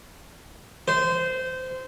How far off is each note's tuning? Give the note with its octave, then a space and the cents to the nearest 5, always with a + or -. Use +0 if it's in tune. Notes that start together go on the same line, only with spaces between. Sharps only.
C5 -20